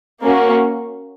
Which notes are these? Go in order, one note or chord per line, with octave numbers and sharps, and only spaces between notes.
A#3 C#4 F#4